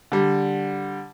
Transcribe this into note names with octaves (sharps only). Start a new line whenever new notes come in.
D3 G3